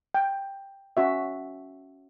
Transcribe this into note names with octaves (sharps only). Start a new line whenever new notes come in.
G5
C#4 F#4 E5